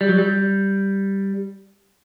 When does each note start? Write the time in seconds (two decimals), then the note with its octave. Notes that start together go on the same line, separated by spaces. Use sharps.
0.01 G3
0.09 F#3
0.18 G3